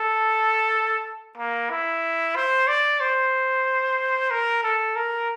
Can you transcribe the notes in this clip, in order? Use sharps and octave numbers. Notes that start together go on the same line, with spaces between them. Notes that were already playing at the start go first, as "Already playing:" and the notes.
Already playing: A4
A#3
E4
C5
D5
C5
A#4
A4
A#4